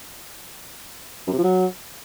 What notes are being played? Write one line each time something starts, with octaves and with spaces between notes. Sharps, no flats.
F#2
C3
F3
F#3